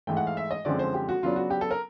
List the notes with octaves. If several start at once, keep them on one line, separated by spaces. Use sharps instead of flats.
G#2 E3 A3 G5
F#5
F5
E5
D#5
F#2 D3 F3 G#3 C4 D5
C5
G4
F#4
C#3 F#3 B3 D4 F4
F#4
G4
A4
A#4